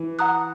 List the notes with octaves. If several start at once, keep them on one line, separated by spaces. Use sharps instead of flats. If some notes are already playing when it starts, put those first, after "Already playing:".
Already playing: E3
F#5 A#5 D#6 F#6